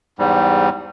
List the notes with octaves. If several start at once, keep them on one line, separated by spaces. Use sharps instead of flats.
E2 G#2 G3